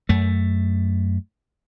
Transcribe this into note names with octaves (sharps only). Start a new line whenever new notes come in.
F#2 A3